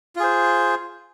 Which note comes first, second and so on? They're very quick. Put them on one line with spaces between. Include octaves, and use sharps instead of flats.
F4 G#4 C5